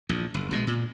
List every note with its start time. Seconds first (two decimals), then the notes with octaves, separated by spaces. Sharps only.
0.09 A#1 E2
0.34 F#1
0.51 A#1 B2 F3 G#3
0.67 A#2